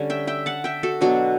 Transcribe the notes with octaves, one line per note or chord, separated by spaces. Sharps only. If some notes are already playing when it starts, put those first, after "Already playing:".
Already playing: D3 G3 C#4
E5 G5
E5 G5
F#5 A5
E5 G5
F#4 A4
B2 F#3 B3 D4 F#4